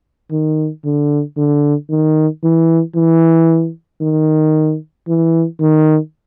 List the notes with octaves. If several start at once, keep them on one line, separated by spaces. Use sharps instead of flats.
D#3
D3
D3
D#3
E3
E3
D#3
E3
D#3